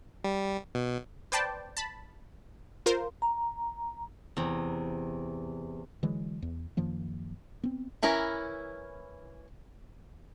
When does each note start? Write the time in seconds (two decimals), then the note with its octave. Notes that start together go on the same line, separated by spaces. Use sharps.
0.24 G3
0.75 B2
1.32 B4 C5 D5 G5 A5
1.77 A5 B5
2.86 F4 A#4 C5
3.22 A#5
4.37 E2 C3 A#5
6.03 D3 E3 F#3 G#3
6.42 E2
6.77 F#2 D#3 F3 A#3
7.63 B3 C4
8.03 E3 C#4 E4 A#4